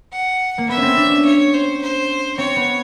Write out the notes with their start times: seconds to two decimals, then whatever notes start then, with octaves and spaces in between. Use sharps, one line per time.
0.12 F#5
0.58 A#3
0.69 B3 E5
0.77 C#4
0.82 C4
0.97 D4
1.11 C#4
1.25 C#5
1.54 C5
1.81 C5
2.38 C4 C#5
2.56 B3